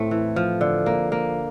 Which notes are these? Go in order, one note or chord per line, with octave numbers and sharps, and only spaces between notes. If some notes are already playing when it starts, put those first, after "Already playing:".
Already playing: A2 A3 C4
E3
F3
D3
A#3
A#3